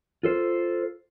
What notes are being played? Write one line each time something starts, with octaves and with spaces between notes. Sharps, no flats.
F4 A4 C5